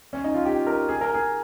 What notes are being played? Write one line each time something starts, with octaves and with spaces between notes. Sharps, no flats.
C#4
D#4
F4
G4
A#4
G#4
A#4
G#4